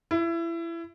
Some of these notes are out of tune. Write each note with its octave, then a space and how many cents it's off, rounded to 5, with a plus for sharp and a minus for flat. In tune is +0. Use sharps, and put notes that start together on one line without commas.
E4 +25